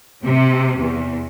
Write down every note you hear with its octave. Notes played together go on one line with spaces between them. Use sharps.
C3
E2